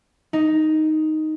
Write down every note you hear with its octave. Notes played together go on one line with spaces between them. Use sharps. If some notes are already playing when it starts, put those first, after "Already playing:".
D#4